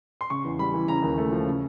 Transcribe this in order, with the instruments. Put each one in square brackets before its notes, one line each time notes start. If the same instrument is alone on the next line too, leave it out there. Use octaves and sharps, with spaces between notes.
[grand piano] C6
C#3 C#6
E2
G3 B5
E3
C#3 A#5
D#2
A3
F3
C#3